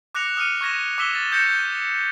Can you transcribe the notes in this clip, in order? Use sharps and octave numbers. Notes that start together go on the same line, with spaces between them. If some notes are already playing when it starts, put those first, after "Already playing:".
D6 F#6 A#6 C#7 F7
D#6 F6 C#7 D#7
C#6 G#6 A#6 E7
D6 E6 B6 E7 G7
A6
D#6 G6 A#6 C#7 E7 G7